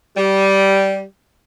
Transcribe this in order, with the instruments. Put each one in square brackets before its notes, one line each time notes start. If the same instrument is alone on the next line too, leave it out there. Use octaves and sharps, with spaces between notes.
[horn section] G3